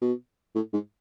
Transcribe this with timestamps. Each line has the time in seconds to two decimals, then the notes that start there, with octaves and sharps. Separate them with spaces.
0.01 B2
0.55 A2
0.73 G#2